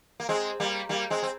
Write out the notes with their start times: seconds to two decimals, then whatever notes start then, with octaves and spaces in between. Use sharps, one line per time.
0.20 A#3
0.29 G#3 C4
0.60 G3 A#3
0.89 G3 A#3
1.10 G#3 C4
1.23 C4